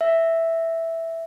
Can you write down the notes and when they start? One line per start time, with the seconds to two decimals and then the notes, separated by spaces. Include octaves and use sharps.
0.01 E5